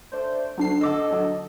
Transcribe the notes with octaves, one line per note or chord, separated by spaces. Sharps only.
A3 D4 C5
D2 F#3 D4 C7
D3 A4 D#5 D6 E6
D3 F#3